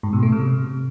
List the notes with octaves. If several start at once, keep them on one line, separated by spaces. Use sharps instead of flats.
G#2
B2
A3
C3